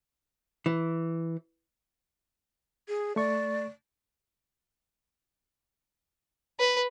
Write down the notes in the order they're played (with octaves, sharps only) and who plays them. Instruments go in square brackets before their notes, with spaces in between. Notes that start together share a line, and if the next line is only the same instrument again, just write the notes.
[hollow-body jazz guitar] E3
[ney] G#4
[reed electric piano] A3 C#6 [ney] D5
[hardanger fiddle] B4